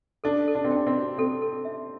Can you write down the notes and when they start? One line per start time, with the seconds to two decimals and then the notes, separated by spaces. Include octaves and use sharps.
0.24 D4 A4
0.48 A4
0.55 D4
0.65 C4
0.71 D4 G5
0.87 C4
0.95 F#4
1.18 C4 A4
1.42 A4
1.65 E5